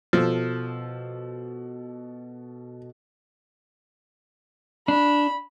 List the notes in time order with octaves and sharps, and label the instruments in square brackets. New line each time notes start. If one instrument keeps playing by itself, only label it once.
[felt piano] B2 A4 E6 [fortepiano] F3
[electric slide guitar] D4 [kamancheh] B5